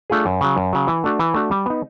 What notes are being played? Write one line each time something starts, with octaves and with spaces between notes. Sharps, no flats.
A3 D4 F4 G#4
F#2
C#3 F#3
F#2
C#3 F#3
E3
A3 D4 F#4
E3
A3 D4 F#4
G3
B3 D#4